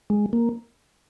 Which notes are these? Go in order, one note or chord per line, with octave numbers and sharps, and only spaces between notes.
G#3
A#3